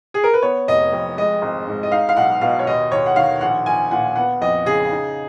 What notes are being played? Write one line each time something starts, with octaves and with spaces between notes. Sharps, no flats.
G#4
A#4
B4
B3 C#5
F1 D#5
F2
G#3 D#5
G#1
G#2
D#5
D#4 F5
F5
B1 F#5
B2 F5
C#5
D#2 D#5
D#2 C#5
F#5
D#3 F5
A#1 F#5
A#1 G#5
A#2 F#5
B3 F#5
F2 D#5
C#3 G#4
D#4